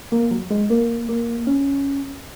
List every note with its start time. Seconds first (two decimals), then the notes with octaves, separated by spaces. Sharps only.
0.12 A#3
0.31 F#3
0.50 G#3
0.70 A#3
1.09 A#3
1.47 C#4